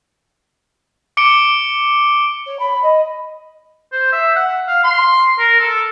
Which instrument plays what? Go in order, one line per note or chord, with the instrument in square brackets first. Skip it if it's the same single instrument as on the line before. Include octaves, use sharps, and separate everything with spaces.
[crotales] D6 C#7 D7 G7
[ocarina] C#5
B5
D#5
[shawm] C5
E5
F#5
F5
C6
A#4
A4